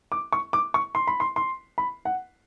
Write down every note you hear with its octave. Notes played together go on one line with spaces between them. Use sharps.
D6
C#6
D6
C#6
C6
B5
C6
C6
B5
F#5